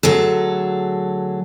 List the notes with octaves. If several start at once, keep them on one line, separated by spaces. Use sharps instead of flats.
D2 F#3 G#4 A4